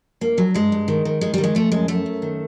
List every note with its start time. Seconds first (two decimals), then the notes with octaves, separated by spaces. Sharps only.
0.21 G2 A#3
0.37 G2 F#3
0.54 G2 G#3
0.72 G2
0.88 D#3
1.05 D#3
1.21 D#3 G#3
1.34 D#3 G3
1.44 G#3
1.55 F3 A3
1.72 F#2 G#3
1.88 F#2 A3
2.06 F#2
2.22 D#3